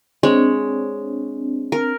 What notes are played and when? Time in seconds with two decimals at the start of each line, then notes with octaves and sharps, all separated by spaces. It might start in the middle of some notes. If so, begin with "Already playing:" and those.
0.23 G#3 C4 D4 C#5
1.72 A#4